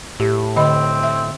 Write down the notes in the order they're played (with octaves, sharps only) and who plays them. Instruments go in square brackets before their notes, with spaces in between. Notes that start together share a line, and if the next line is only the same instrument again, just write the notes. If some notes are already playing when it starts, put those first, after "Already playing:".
[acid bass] A2 [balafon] G4
[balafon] D3 D#5 B5 [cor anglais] C4
[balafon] E5